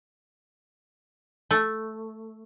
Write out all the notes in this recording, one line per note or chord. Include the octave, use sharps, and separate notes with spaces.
A3